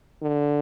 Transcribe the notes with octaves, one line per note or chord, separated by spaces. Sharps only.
D3